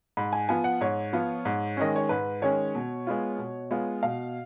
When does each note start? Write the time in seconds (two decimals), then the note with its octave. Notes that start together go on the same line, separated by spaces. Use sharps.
0.17 G#2 B5
0.33 G#5
0.49 F3 B3 F4 G#5
0.64 F#5
0.81 G#2 C#5
1.13 F3 B3 F4
1.45 G#2
1.77 D#3 G#3 C#4 D#5
1.96 C#5
2.09 G#2 B4
2.42 D#3 G#3 C#4 C#5
2.75 B2
3.07 G#3 B3 F4
3.38 B2
3.71 G#3 B3 F4
4.03 B2 F5